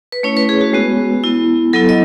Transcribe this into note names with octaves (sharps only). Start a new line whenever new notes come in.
B4
A3 C#4 E4 C#5
B4
G#4
F#4
G#3 B3 F#4
B3 E4
F#3 B3 E4 A4
D#5